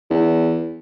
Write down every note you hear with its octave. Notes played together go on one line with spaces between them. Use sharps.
E2